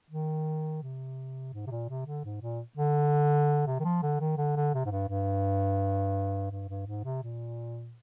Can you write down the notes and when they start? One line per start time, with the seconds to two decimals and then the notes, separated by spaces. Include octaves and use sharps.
0.10 D#3
0.83 C3
1.53 G#2
1.67 C3
1.71 A#2
1.89 C3
2.06 D3
2.25 G#2
2.42 A#2
2.77 D3
3.67 C3
3.80 D#3
3.84 F3
4.03 D3
4.20 D#3
4.38 D3
4.56 D3
4.74 C3
4.85 G#2
4.91 G2
5.09 G2
6.51 G2
6.69 G2
6.86 G#2
7.04 C3
7.23 A#2